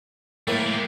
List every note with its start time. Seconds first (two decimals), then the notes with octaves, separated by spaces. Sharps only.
0.48 A2 A3 A#3 A#4
0.66 G#3 G4